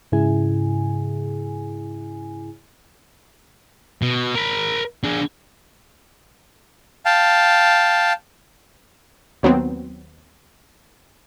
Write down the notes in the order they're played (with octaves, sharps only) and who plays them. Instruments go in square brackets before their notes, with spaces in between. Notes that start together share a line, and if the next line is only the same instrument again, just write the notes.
[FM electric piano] G#2 C#3 E4 G#4 G#5
[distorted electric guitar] B2
A#4 B5
D4 G#4
[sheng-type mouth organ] F5 G5 A5
[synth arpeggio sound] D#2 F#3 B3 C4